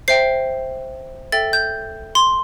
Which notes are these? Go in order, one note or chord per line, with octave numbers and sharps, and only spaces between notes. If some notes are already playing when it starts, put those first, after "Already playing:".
C5 E5 G5 C7
A4 E5 G5 A6
G6
C6